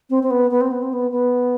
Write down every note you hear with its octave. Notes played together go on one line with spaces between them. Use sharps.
C4
C4
B3
B3
C4
B3
C4
B3
B3